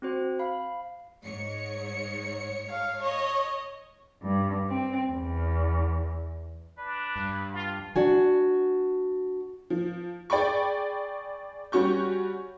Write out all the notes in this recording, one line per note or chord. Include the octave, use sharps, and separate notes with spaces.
C4 F#4 C5
F5 B5
G#2 C#5 C#7
F5
C#5 D#5
G2
C4
E2
D4 B4
G2
F4
D4 F#4 G#5
F3
G#4 D5 G5 B5 C#6
G3 C#4 F#4 C#6 G6